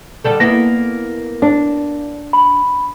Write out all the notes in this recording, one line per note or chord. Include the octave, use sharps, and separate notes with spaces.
D3 G3 A4
A#3 B3 E4 A#6
D4
B5